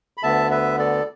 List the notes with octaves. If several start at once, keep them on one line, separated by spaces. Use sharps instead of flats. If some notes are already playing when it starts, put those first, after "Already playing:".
B5
D2 D3 B3 E5 A5
B4 E5
A4 D5